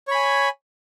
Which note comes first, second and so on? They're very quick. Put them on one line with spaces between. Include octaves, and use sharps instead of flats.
C#5 B5 G#5